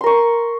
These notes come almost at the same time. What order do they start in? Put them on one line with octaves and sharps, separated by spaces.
C6 A#4 C#6